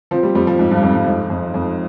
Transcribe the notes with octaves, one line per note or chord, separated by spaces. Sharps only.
F3 C4
G3
F2 G3
F3
F2 G#2
G2
F2 G#2
G2
F2 G#2
F2
F2